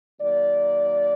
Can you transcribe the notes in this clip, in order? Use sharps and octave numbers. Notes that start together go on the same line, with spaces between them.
D#3 F#3 A#3 D5